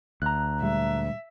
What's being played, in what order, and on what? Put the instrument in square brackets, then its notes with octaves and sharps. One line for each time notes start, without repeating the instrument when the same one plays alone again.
[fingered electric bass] D2 [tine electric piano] A#5 F#6
[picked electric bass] A#2 G3 G#3 [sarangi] E5